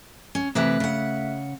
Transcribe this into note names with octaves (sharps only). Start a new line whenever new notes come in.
C#4
C3 E3 A3 B4 E5 F#6
C#3 F#5